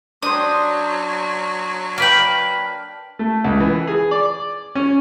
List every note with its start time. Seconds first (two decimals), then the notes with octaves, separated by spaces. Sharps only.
0.23 F#3 D4 C5 D#6
1.98 A#3 B4 G5 F6 B6 F#7
3.19 A3
3.44 C#2
3.60 E3
3.87 G#4
4.11 D5
4.75 C#4